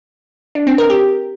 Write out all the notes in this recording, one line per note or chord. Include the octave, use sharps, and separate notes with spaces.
D4
C4
A#4
G4